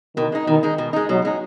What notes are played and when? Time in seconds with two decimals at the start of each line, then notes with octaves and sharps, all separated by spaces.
0.16 B2 D#3
0.32 G#3 D#4
0.47 B2 D#3
0.63 G#3 D#4
0.78 B2
0.93 G#3 D#4
1.09 B2 F#3
1.25 G#3 D#4